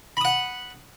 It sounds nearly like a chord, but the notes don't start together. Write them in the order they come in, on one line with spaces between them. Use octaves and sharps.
B5 D#6 F#5